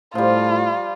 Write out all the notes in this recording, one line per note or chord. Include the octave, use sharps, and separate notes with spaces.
A2 F3 G3 F4